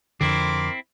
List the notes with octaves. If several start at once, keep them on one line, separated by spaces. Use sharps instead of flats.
F2 D3 C4 E4 A#4 C6 D6